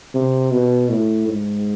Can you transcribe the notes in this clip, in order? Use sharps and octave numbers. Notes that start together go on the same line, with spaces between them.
C3
B2
A2
G#2